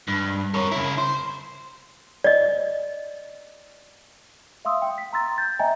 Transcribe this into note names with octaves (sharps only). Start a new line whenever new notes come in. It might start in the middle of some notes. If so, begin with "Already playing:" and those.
G2
A#4 C#5
C#3 E4
C5
D5 D#5
E5 F5 C6 D#6 E6
G5
B6
A#5 C6 E6 A6
G6 A6
D#5 E5 G5 G#5 A#5